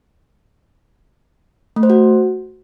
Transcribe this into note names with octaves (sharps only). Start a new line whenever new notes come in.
A3
C5
F#4